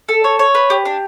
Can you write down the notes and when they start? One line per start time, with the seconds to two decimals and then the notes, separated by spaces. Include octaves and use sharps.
0.09 A4
0.24 C#5
0.39 C#5
0.55 B4
0.70 G4
0.85 D4